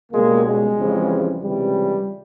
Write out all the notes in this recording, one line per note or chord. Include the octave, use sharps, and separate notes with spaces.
C#2 B2 G3 G#3 A#3
G#3
F2 C#3 E3 G3
C#2 C3 E3 G3